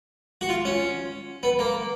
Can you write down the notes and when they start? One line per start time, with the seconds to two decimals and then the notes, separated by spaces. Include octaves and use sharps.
0.41 F#4
0.49 F4
0.65 C#4
1.43 B3
1.59 A#3